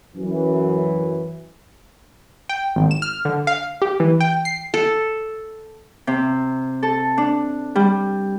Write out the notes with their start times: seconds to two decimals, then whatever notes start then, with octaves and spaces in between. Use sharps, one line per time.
0.16 F#2 E3
2.49 G5
2.76 G#1
2.91 E7
3.02 F6
3.25 D3
3.47 F5
3.82 G4
4.00 E3
4.21 G5
4.45 C7
4.74 A4
6.07 C3
6.83 A4
7.18 D4
7.75 G3